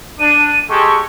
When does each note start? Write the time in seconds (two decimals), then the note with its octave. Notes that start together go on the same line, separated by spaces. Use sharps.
0.20 D4 D#7
0.70 G#3 G4 A4 C#6